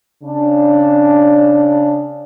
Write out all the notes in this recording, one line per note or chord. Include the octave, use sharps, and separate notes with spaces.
C#3 D4